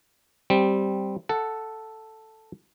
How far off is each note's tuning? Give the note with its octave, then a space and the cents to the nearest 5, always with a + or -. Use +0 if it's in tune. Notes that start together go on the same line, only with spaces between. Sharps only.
G3 -5 C4 +0
A4 +0 F#5 +0